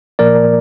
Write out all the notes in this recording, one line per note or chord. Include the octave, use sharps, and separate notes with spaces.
A#2 F3 A#3 A#4 D5